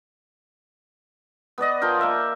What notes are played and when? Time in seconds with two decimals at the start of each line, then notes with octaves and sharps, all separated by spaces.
1.58 B3 B4 D5 D#5
1.82 F3 F4 A#4 G5
2.01 A#3 E5